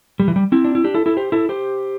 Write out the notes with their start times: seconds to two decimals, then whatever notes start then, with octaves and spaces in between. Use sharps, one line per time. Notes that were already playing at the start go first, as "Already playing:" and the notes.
0.20 G3
0.28 E3
0.36 G3
0.52 C4 E4
0.65 D4
0.75 E4
0.84 D4 G4
0.94 E4 A4
1.06 E4 A4
1.17 G4 C5
1.32 E4 A4
1.49 G4 C5